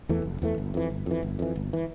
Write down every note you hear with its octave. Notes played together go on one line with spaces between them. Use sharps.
E2 E3 A3
F1
E2 E3 A3
G1
F2 E3
G1
F2 E3
G1
F2 E3
G1
E3